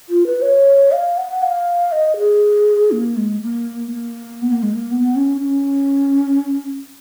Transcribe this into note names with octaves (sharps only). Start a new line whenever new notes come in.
F4
B4
C#5
F5
F#5
F5
D#5
G#4
A#3
G#3
A#3
A#3
B3
A#3
G#3
A#3
B3
C#4
C#4